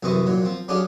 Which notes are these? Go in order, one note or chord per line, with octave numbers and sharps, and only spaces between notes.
C2 F#2 E3 C4 D#5 C#6
A#2 F#3
F3 C4
F#3 C#4 D4 G4 G#4 F5